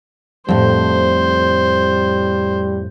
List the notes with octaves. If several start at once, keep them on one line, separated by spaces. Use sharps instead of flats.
F2 A2 G3 C5